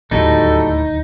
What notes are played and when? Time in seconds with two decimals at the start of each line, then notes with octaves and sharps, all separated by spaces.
0.11 D1 D#2 A2 G3 D#4 F#4 A4